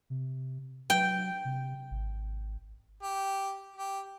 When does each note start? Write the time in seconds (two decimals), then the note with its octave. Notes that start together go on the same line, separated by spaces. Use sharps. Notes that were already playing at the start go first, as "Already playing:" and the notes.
0.10 C3
0.90 F#3 G5
1.45 C3
1.91 G#1
3.02 G4
3.76 G4